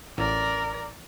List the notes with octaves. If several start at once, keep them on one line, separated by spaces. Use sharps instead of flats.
A1 A#4 D5